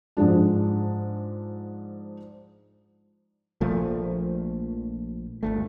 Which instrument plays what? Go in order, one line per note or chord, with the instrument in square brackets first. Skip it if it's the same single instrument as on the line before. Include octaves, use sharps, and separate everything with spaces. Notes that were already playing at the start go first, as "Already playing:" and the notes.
[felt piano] G#2 F3 G#3 D4
[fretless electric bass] A#1 A#2 F3 A3
G1 D2 A3